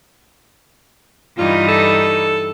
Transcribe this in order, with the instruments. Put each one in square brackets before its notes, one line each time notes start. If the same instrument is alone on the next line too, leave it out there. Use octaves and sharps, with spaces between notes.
[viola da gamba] G2 E3 D#4 [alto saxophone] F4
[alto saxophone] A4